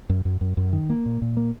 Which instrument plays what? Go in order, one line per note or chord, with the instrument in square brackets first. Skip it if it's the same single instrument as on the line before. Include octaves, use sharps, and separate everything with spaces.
[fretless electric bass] F#2
F#2
F#2
F#2
D#3
A#3
A#2
A#2
A#3